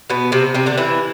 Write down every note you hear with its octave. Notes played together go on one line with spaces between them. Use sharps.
B2 B3
C3 C4
C3 C4
D3 D4
E3 E4